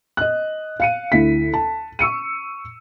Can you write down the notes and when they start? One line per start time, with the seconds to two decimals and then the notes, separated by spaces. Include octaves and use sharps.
0.17 D#5 F#6
0.80 F5 C#7 D#7
1.12 D2 E4 B6
1.53 A5
1.99 C#6 E6 C#7 D#7